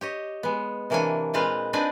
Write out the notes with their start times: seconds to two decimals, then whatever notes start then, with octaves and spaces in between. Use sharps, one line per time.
0.01 G4 C#5 D#5
0.43 G#3 B3
0.90 C3 E3 A#3 D4 C#5 G#5
1.33 A#2 G#3 C4 F4 B4 F5
1.73 C4 D4 D#4 B4 D5 G#5